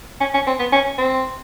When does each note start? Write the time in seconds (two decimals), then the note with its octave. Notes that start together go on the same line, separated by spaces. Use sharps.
0.21 C#4
0.34 C#4
0.47 C4
0.59 B3
0.72 C#4
0.98 C4